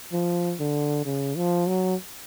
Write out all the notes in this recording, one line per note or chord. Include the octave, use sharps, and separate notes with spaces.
F3
D3
C#3
F3
F#3